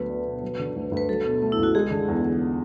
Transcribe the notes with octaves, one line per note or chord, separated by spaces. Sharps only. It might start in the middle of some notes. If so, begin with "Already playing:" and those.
Already playing: D2 F#3 B3 B4
D4
B2
F#3
D3
D2
D2
B4
F#3 A4
B2
A3
E4
C#2
F#4
G#3 G#4
D3
E2